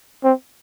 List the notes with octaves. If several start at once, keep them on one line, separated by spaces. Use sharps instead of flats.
C4